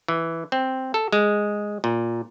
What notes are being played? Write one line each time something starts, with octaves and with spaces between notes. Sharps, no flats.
E3
C4
A4
G#3
A#2